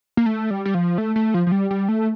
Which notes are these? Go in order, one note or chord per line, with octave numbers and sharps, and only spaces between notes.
A#3
A3
G3
G3
F3
A3
A3
F3
F3
G3
G3
A3